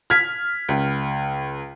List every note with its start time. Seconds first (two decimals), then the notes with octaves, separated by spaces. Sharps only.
0.10 F6 G#6 B6
0.69 C#2